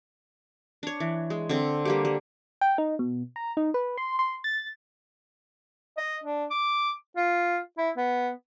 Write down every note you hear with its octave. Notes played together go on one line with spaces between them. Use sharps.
D4 C#5
E3
G#3
D3 C4
G3 A#3 G4
G3
G5
D#4
B2
A#5
D#4
B4
C6
C6
A6
D#5
D4
D6
F4
E4
B3